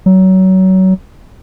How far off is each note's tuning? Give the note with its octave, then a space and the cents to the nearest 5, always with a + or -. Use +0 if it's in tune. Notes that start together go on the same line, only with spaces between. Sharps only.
F#3 +25